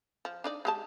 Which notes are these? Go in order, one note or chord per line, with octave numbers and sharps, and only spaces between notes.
F3
D4 D#4 D5
G#3 G4 A5